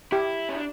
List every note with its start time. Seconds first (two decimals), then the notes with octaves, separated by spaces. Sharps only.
0.12 E4 G4
0.49 C#4
0.56 D4